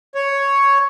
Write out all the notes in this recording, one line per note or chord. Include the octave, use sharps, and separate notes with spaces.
C#5